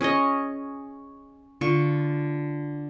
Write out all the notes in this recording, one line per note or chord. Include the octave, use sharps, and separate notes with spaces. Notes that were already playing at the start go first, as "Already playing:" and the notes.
C#4 G#4 C#5 D#5
D3 F4 C#6